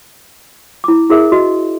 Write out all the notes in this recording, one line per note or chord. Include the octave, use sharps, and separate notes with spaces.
E4 D6
E4 G#4 A#4 E5
F#4 D#5